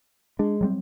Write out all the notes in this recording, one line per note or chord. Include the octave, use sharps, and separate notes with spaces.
G#3 D4
F#3 G3 C4